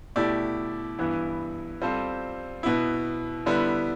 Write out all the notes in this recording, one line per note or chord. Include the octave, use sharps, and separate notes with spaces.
B2 A3 E4 G4 D5
G2 E3 B3 E4
G3 C4 F4 A4 C5
B2 B3 E4
D3 G3 B3 E4